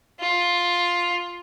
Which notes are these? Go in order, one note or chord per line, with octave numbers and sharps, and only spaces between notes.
F4